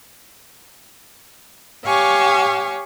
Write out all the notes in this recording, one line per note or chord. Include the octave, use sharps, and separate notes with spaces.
G4 C#5 F5 G#5 C#6